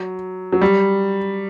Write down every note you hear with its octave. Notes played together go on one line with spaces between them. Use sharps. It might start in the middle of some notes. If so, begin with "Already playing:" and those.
Already playing: F#3
F#3
G3